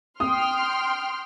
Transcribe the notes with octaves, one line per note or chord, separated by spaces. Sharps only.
G5 C6 D#6 F6